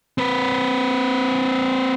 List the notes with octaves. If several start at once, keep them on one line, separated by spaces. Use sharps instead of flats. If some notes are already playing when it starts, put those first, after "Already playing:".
C4 B4